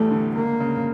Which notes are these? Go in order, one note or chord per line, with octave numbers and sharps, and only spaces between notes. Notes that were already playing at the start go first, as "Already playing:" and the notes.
Already playing: E2 A2 G3 A3
D3
C#2 A#3
C#3